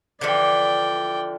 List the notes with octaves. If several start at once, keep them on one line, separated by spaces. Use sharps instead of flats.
D3 E3 F3 D5 G5